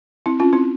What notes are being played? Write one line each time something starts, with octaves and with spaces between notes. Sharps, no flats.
C4 E4
C#4 F4
C4 E4